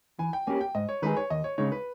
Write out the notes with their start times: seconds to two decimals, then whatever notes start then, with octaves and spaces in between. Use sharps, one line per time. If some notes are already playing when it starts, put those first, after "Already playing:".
0.19 E3 G#5
0.33 G5
0.47 A#3 C#4 G4 G#5
0.61 G5
0.75 G#2 D#5
0.89 C#5
1.02 D#3 G#3 D#4 G#4 B4
1.17 C#5
1.30 D#2 D#5
1.44 C#5
1.58 C#3 G#3 D#4 C#5
1.72 B4